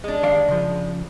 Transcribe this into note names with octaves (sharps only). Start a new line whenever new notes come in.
G#3 D4
D#2 D5 F5
C#3 F3